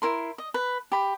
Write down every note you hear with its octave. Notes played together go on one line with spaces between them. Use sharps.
E4 A#4 C6
D#5
B4
G4 B5